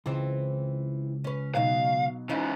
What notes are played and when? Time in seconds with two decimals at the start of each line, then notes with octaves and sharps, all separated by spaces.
0.06 C#2 E3 C4
1.24 C#4 B4
1.55 B2 F#3 D#4 F5
2.29 G#2 C#3 E3 D#4 F4